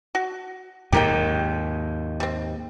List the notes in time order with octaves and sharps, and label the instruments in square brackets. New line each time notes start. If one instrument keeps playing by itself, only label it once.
[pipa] F#4
[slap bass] D#2 G#2 [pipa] G4 A#4 G5
[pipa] G3 C4